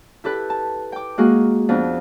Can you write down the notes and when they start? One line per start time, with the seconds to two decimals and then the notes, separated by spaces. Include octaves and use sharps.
0.24 E4 G4 A4 B4
0.50 A5
0.92 G5 D6
1.18 G#3 A#3 F#4 G#4
1.69 F2 B3 D4